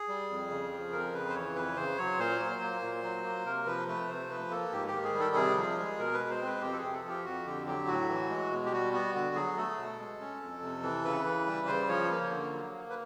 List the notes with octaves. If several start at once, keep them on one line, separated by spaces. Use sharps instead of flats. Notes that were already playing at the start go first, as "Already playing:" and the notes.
Already playing: G#4
G3
F2
C#3
F3
F2 A#4
C#3 B4
C5
E3 C#5
F2 B4
C#3 C5
F#3 C#5
A#2 C5
F#3
A#3
A#2
F#3
A#3
C3 A#4
F3 B4
A3 B4
C3 C5
F3 B4
A#3 A4
G#2 G4
G4
D#3
G#4
G3
A4
C3 G#4
F3
G#3
B2 A#4
B4
G#3
C5
C4 B4
F2 G4
A4
C3 G#4
A4
F3
G4
F2 F#4
D3 G4
F#3 G4
A2 F#4
E3
G#3
B2
G4
G3 F#4
B3 F#4
D3 F#4
F#3 G#4
A3 A4
B2
G#3
C#4
F2
C3
E3
C#3 B4
E3
G3
C#3 C5
F3 C#5
A#3
D3
F#3
A#3
B4